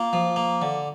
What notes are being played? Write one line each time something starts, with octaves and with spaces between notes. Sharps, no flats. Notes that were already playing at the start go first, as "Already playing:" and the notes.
Already playing: A#3 F4
F3
A#3
D3